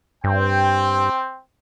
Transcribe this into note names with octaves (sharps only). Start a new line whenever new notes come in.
G2 C4 G5